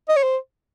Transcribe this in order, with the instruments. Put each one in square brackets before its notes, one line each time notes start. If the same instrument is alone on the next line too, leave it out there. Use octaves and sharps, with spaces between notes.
[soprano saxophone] D#5
C#5
C5